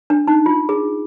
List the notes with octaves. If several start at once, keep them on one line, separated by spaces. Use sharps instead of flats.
D4
D#4
F4
G#4